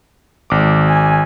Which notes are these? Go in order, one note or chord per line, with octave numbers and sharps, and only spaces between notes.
G#1 D6
G#5